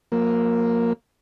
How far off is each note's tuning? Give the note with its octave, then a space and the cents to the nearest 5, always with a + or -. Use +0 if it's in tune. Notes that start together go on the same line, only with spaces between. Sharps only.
F3 +40 A#3 +0